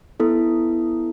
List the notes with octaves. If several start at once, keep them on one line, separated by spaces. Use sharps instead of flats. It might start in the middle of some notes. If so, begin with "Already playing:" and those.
B3 E4 A4